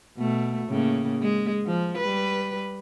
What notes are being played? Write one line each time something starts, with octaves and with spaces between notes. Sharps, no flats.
B2 A3
A2 C#3 A#3
G#3
F3
G3 B4